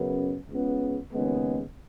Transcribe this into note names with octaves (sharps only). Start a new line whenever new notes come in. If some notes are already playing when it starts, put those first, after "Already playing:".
Already playing: F#2 C#3 B3
C#2 C#3 B3
D#2 C#3 G#3 B3